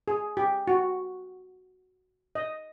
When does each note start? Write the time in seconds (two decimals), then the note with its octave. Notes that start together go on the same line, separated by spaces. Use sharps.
0.08 G#4
0.37 G4
0.68 F#4
2.35 D#5